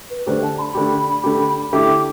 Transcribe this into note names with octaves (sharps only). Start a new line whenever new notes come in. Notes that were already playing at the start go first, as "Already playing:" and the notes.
B4
D3 A3 D4 G4 C5
A5
C6
B5
D3 A3 D4 G4
D3 A3 D4 G4
D3 A3 E4 G4 D6
D6